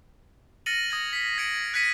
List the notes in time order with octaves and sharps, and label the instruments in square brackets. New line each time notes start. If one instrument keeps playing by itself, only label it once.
[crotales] F6 A6 A#6 C#7 D#7 F#7
D#6 G#6 A#6
B6 C7
G#6 A#6 B6 C#7 D7 F#7
F#6 G#6 A#6 B6 C#7 D#7